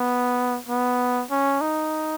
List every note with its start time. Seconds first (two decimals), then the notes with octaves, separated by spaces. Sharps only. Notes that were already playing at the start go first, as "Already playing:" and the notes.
Already playing: B3
0.69 B3
1.31 C#4
1.61 D#4